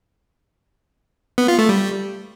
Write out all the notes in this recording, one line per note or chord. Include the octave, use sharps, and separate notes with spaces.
B3
F4
A3
G3